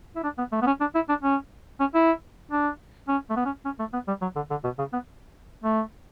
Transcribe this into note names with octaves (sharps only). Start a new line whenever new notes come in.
E4
D4
B3
A3
B3
C#4
D4
E4
D4
C#4
C#4
E4
D4
C#4
A3
B3
C#4
C#4
A3
B3
G3
F#3
D3
D3
B2
C#3
B3
A3